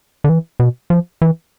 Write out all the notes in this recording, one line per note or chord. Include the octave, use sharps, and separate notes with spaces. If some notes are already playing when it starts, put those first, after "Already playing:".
D3
E3
B2
F3
E3